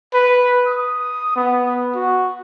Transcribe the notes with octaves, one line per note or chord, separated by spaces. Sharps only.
B4
D#6
B3
F#4